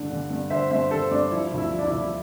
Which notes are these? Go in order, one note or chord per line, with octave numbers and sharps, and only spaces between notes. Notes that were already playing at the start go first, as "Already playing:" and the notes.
Already playing: G2 D3
D3
G2
D3 C5 E5
G2 C5 E5
D3 A4 C5
G2 D4
F3 E4
D2
E4
F3
D4
E4
D2
E4